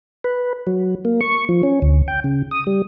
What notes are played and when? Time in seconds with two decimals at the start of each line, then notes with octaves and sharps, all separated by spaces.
0.24 B4
0.67 F#3
1.05 A#3
1.21 C#6
1.49 F3
1.63 C#4
1.82 D2
2.08 G5
2.24 C#3
2.51 D#6
2.67 G3